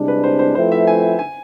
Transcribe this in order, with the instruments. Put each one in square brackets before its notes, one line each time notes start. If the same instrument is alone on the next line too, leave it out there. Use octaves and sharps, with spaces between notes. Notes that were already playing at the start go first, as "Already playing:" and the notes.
Already playing: [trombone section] C2 C3 G#3 D4
[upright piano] B4
C5
C5
[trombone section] F3 A3 C4 E4 B4 [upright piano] C5
[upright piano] E5
G#5
G#5